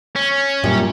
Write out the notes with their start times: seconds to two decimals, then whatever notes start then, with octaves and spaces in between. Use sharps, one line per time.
0.16 C#4
0.64 F#2 A#2 G3